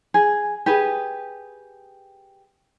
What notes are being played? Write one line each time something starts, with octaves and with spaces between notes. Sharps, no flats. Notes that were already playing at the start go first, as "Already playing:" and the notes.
G#4
G4 G#4 B4